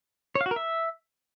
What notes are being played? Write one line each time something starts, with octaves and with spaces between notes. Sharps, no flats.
C#5
F5
F#4
A#4
E5